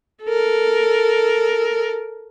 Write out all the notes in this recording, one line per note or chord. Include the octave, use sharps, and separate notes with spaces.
A4 A#4